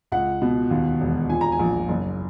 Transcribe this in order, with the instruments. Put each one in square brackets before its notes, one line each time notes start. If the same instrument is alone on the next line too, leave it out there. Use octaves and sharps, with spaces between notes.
[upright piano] C#2 F#5
B2
D#2
E1
A#2 G#5
A#5
G#5
A#1
F#1